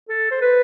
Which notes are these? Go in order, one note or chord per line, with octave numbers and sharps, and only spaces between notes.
A4
C5
B4